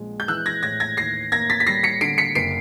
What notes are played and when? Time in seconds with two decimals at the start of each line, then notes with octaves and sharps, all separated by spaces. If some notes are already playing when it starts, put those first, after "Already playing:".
Already playing: A#1 G#3
0.20 G6
0.28 E3 E6 F#6
0.46 G#6 A#6
0.63 A2 G#6 A#6
0.80 G#6 A#6
0.97 D#2 A#6 C7
1.32 A#3 G#6 A#6
1.50 A6 B6
1.60 B6
1.67 G3 A#6 C7
1.83 B6 C#7
2.01 D3 C7 D7
2.18 B6 C#7
2.35 F#1 C7 D7